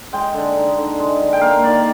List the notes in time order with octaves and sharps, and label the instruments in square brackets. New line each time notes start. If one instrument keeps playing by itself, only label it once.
[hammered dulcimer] G#3 G5
D3
D#4
D3
G#3
D3
G5
A#3 F5
D#3 D5